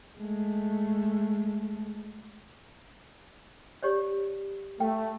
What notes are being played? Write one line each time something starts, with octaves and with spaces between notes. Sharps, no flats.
G#3 A3
G4 C#5 D5
A3 G5